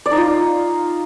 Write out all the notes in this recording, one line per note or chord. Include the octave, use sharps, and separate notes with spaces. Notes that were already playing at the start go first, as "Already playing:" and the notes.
D5
D#4
F4